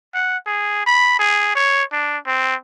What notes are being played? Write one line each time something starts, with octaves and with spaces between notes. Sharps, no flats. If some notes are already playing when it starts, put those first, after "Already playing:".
F#5
G#4
B5
G#4
C#5
D4
C4